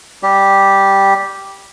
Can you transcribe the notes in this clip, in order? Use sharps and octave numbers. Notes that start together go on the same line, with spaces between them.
G3 G4